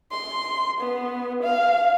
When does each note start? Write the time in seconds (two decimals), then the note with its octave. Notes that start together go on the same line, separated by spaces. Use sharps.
0.12 C6
0.81 B3
1.43 F5